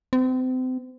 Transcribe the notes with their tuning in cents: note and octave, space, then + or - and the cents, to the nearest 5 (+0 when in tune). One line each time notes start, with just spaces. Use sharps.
C4 -35